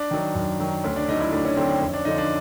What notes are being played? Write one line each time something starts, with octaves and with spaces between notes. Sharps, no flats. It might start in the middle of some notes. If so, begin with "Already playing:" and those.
Already playing: D4
D#3 F#3
F#2
D#3 F#3
D2 C#4
D4
D3 F#3 D#4
E4
D2 D4
C#4
D3 F#3 C4
C4
F2 C#4
D4
D3 F3 D#4
D4